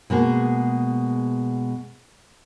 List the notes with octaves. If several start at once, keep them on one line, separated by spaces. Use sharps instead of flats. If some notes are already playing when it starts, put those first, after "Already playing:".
B2 G#3 A#3 G#4